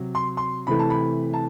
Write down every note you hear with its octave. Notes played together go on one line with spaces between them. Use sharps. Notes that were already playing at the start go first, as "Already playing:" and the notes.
Already playing: C3 F#3
C6
C6
C3 E3 A3 B5
A5
B5
A5